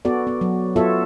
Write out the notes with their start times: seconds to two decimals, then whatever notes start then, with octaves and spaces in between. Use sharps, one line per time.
0.05 B3 F#4 A4 D5
0.27 B3
0.41 F#3
0.76 B3 F4 F#4 A4 C#5 E5